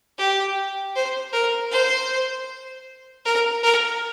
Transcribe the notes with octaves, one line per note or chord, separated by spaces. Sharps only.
G4
C5
A#4
C5
A#4
A#4